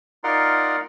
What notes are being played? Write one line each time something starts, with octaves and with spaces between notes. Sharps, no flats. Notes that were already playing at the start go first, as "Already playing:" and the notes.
D#4 F4 A#4 D5 F#5 C6